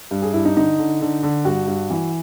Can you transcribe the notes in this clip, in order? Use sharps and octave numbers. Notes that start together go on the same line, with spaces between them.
G2
G#4
G2 E4
D#4
D3 D#4
D3
D3
D3
G2 F#4
G2
E3